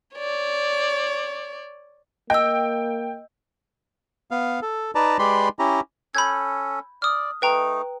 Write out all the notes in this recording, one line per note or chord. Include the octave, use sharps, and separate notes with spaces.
C#5 D5
A#3 D#5 G5 E6
B3 F5
A4
D#4 B4 D5 A5 A#5
G#3 G4 B4 D5 B5 C6
C#4 E4 G4 A#5
C#4 A4 B5 G6 G#6
D5 D#6 F6
A3 D#4 B4 G5 A#5